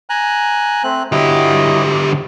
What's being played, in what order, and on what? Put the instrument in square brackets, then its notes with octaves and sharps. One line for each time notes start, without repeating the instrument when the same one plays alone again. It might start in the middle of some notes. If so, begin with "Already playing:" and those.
[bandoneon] G#5 A#5 F#6
A3 C4 F#6
[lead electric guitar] D3 G4 [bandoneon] F#3 E4 D#5